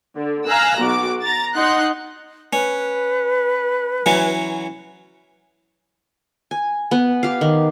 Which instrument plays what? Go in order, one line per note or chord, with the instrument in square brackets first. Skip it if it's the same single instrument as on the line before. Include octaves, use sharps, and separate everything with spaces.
[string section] D3
F5 G#5 A#5 E6 F#6
B1 F#4 D6
A#5 A6
D#4 F#5 C6 F#6
[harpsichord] C#4 [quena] B4
[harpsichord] E3 F#3 C#4
[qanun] G#5
B3
G4 F5
D#3